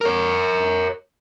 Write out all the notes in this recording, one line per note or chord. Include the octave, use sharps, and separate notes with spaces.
A#4 C#5